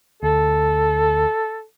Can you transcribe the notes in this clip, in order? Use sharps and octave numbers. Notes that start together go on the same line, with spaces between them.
D2 A4